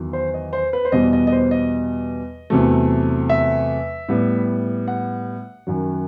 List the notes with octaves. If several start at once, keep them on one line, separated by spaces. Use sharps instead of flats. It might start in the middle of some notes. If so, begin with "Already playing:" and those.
Already playing: E2 D#3 F#3
C5
D#5
C5
B4
C5
E2 B2 G3 B3 D#5
D#5
D#5
C5
D#5
E2 C3 F#3 A3
E5
A2 G3 B3
F#5
F#2 D#3 F#3